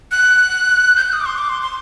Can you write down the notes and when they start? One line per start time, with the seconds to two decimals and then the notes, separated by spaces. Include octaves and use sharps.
0.11 F#6
0.96 G6
1.01 F#6
1.13 D#6
1.20 D6
1.26 C6
1.38 D6
1.49 C6
1.62 C6